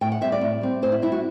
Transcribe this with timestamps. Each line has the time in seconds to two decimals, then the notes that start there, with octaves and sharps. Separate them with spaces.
0.01 A2 G5
0.12 F#5
0.21 G3 C4 E5
0.32 D5
0.41 A2
0.61 G3 C4
0.82 A2 C5
0.92 E4
1.02 G3 C4 E4
1.12 F#4